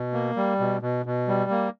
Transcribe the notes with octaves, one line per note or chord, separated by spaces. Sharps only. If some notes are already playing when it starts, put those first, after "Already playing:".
Already playing: B2
A#3
G3
B2
B2
B2
G3
A#3